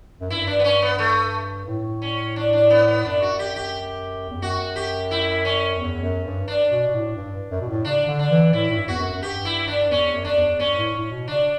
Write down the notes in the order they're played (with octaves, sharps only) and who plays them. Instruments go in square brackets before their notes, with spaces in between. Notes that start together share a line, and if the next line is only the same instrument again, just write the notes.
[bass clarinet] F#2
[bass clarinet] G2 [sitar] E4
[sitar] D4
B3
C#4
B3
A3
[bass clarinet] A2
[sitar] C#4
D4
D4
B3
B3
[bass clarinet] F#2 [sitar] D4
[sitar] F#4
G4
G4
[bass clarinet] E2
[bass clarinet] F#2 [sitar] F#4
[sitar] G4
E4
C#4
[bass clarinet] E2
F#2
G2
[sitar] D4
[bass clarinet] B2
B2
A2
G2
F#2
B2
A2
[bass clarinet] C#3 [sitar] D4
[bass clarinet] C#3
D3
[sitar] D4
[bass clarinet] E3
[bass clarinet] A2 [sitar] E4
[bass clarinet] A2
G2
[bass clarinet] E2 [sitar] F#4
[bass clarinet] F#2
F#2
[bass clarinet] G2 [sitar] G4
[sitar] E4
D4
[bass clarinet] E2 [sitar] C#4
[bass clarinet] F#2
[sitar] D4
[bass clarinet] F#2
E2
[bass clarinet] G2 [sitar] C#4
[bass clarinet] A2
A2
B2
[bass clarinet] C#3 [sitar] D4